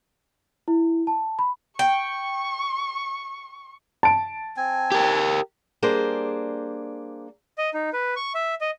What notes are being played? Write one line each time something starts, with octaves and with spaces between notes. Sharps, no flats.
E4
A5
B5
G5 C#6
A5 D7
C4 G#5
G4 A#4
G3 A#3 D4 G#4 C5
D#5
D#4
B4
C#6
E5
D#5